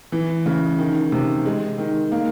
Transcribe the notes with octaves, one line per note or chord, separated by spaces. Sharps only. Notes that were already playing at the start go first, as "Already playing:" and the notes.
E3
C#3
D#3
C3
G#3
D#3
A#3